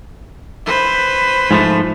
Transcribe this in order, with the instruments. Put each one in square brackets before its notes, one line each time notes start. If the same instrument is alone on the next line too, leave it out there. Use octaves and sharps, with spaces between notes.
[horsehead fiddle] B4 C5
[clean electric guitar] G#2 F3 A3